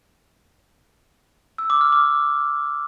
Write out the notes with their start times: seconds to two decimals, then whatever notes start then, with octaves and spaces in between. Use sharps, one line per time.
1.58 E6
1.70 D6
1.81 F6
1.92 D6